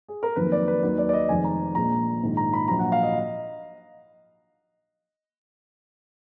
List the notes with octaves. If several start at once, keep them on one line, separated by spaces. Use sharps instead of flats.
G#4
A#4
F2 D#3 F#3 A#3 B4
D5
B4
D#2 D#3 F#3 B4
D5
D5
D#5
F1 F2 D#3 G#3 G#5
A#5
A#1 A#2 G#3 A#5
A#1 G#2 D#3
A#5
B5
A#1 A#2 F#3 A#5
F#5
F5
D#5